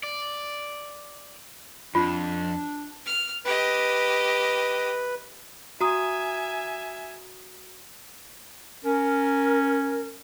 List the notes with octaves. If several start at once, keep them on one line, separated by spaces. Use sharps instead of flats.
D5
F2 D4 F4
F6
G4 B4 D#5
F#4 E5 G#5 A#5 D#6
C#4 A#4